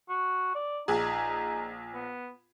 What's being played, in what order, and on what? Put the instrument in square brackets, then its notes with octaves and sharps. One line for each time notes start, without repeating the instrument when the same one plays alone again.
[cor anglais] F#4
D5
[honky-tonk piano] A#1 G#4 [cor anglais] D#4
[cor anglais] B3